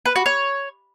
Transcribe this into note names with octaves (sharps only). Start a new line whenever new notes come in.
B4
F#4
C#5